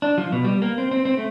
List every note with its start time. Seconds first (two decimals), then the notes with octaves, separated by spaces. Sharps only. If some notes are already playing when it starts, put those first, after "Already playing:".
0.02 D4
0.18 F3
0.32 B2
0.44 G3
0.62 A#3
0.78 C4
0.91 C4
1.05 C4
1.17 A3